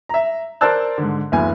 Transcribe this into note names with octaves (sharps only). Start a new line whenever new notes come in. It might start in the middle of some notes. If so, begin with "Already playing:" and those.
E5 A#5
A#4 C5 D5 A5 E6 F#6
G#2 D3
F#1 D2 E3 B3 G#5